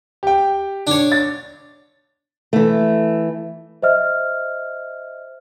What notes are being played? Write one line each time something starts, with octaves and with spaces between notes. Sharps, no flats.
G4 G5
D4 C#5
A6
E3 A3
C5 D#5 E5 F6